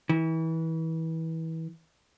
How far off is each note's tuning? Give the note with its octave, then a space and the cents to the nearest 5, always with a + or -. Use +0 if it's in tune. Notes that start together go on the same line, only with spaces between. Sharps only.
E3 -30